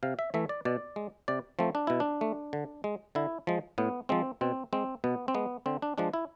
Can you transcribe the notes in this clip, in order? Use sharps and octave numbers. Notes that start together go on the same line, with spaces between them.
C3 F5
E5
E3 A3 E5
D5
B2 D5
G#3
C3 D5
F3 A3 C4
D4
B2 E4
D4
A3
D3
G#3
D3 E4
F3 G#3
A2 B3
F3 G#3 C4
B2 C4
G#3 C4
B2 B3
C4
G#3 B3
D3 C4
D4
F3 G#3 D4
E4